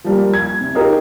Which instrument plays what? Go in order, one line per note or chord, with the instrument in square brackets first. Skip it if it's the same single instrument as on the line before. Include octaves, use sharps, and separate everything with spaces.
[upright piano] F3 G3 A#3
G#6
C3
C#4 D#4 F4 G4 G#4 A#4